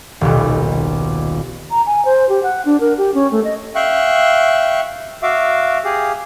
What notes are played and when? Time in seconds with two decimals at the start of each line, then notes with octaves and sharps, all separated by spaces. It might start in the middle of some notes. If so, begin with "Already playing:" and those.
0.21 D#1 B1
1.71 A#5
1.86 G#5
2.05 C5
2.29 G4
2.43 F#5
2.65 D4
2.80 A#4
2.98 G4
3.14 C#4
3.31 A3
3.44 D#5
3.75 E5 F5 G5 C#6 F#6
5.23 F#4 E5 F5 D6
5.84 G4 G#4 F5